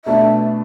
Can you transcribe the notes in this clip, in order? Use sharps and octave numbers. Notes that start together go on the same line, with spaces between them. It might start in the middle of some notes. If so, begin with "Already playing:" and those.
B2 A3 D4 A4 E5